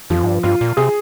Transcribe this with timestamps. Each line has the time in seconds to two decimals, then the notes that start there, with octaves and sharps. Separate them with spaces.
0.10 F2 F3
0.23 G#2
0.28 G2
0.43 G2 F4
0.61 A#2
0.77 C3 G#4